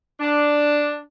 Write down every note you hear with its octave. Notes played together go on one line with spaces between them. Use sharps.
D4